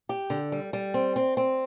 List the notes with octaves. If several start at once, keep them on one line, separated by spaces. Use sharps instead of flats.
G4
D3
G3
G3
C4
C4
C4